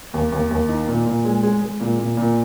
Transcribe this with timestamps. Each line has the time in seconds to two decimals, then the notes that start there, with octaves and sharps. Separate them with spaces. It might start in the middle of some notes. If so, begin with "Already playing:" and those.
0.14 D#2
0.32 D#2
0.51 D#2
0.68 D#4
0.88 A#2
1.06 A#2
1.25 G#3
1.43 G#3
1.61 G#3
1.80 A#2
1.99 A#2
2.17 A#2